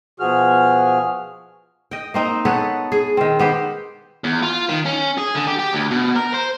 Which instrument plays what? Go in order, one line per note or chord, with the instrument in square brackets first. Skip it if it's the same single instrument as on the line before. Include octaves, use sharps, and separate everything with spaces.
[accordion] B2 F3 F#4 G#4 F6
[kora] D#5 G5
A#3 C4 D#4
B3 A4 B4 C#5
G#4
D#3 C4
B3 G4 C5
[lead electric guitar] E2
F4
D#3
C#4
G#4
D3
G4
G4
D2
B2
A#4
C5